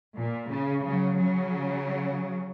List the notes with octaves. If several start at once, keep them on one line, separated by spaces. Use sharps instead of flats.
A#2
C#3
C#3 F#3
C#3 F#3